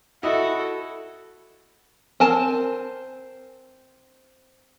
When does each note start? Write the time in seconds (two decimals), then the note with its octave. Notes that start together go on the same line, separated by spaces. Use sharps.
0.23 E4 F#4 A4 D#5
2.20 C4 A#4 G#5 A5